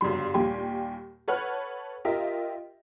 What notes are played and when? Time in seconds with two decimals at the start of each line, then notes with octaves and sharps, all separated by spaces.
0.01 G1 F#2 C#3 G3 C6
0.34 D#2 A#2 G3 G4 G#5 C6
1.28 A4 B4 C#5 F#5 F6
2.05 F4 G4 A#4 D#5 E5